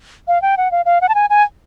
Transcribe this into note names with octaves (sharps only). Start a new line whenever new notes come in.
F5
G5
F#5
F5
F5
F#5
A5
G#5
G#5